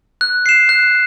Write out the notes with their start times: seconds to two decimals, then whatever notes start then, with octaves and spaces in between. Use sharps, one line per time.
0.21 F#6
0.46 C7 E7
0.69 F#6